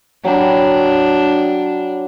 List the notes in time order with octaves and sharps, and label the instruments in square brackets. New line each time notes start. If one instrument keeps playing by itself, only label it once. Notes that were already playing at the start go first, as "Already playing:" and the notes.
[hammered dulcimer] F#3 G5 B5 [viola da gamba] D4